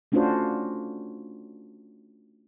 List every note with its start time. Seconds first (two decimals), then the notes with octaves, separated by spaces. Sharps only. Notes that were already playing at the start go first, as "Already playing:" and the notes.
0.12 A3 C#4 D4 F4 F#4 C5